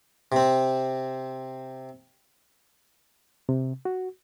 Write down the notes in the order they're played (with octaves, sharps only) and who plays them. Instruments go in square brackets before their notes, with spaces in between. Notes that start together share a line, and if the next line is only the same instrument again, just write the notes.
[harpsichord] C3 C4
[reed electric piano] C3
F#4